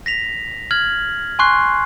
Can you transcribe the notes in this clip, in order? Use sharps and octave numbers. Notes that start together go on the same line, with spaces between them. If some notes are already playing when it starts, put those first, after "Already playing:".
A#6 B6 F7
F6 G#6 F#7
G#5 C6 C#6 F#6 C7